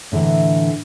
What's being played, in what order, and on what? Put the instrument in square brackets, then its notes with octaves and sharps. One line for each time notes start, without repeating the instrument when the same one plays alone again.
[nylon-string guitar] A2 D3 E3 A#4